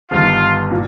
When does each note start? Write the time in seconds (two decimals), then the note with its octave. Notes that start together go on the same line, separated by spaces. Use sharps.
0.11 G1 G2 D#3 F4
0.71 A#2